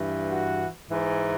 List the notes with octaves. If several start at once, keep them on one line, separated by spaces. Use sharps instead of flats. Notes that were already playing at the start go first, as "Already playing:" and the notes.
Already playing: G2 E3
F#4
G#2 E3